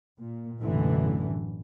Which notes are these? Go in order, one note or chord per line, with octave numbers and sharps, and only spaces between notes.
A#2
A1 F#2 B2 D3 E3